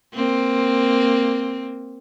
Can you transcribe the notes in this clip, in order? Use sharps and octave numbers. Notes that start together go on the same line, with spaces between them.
A#3 C4